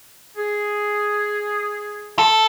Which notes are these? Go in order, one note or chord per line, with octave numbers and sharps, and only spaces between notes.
G#4
A4